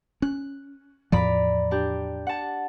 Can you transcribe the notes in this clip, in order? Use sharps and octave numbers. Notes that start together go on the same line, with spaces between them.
C#4 F#6
E2 A2 F3 D5 A#5 B5
D4 G4
F#5 A5